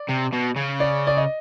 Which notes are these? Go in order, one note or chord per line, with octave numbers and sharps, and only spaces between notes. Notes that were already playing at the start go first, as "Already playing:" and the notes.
Already playing: D5
C3
B2
C#3
D5
D5
D#5